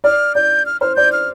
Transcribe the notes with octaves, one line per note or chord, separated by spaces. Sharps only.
D5 F6
D5 G6
F6
C5 F6
D5 G6
F6